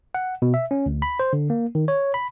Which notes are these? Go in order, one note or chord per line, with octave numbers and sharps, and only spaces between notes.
F#5
B2
E5
C#4
D2
B5
C5
D3
A#3
D#3
C#5
B5